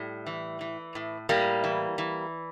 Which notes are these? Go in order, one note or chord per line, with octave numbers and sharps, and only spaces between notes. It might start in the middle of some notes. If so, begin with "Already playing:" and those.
Already playing: A2 G3
E3
E3
A2
A2 G3 A#3
E3
E3